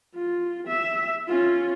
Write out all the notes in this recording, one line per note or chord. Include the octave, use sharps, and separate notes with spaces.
F4
E5
C#4 F4